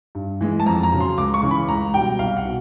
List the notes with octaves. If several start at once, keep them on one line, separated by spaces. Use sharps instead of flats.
G2
E3 G#3
A5
F2 A#5
A#5
C#3 F#3
C6
C#2 D6
C#6
C#3 E3
B5
C#2 A#5
B2 G3 G5
C2 F5
F#5
B2